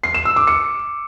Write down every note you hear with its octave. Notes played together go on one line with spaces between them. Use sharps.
C7
E7
E6
D6
C#7